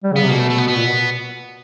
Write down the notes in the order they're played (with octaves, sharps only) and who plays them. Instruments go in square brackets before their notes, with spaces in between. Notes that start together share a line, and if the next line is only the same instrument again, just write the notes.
[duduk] G3
C#3
[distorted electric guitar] B3
[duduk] C3
[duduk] B2 [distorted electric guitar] A#3
[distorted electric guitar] A3
A3
B3
[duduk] B2 [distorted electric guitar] B3
[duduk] A#2
B2